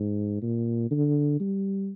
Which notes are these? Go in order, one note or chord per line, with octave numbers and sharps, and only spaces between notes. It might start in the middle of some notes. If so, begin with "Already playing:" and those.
Already playing: G#2
A#2
D3
G3